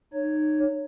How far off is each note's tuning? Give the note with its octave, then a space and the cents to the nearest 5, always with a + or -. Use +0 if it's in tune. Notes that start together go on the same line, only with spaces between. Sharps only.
D#4 -25 C#5 +0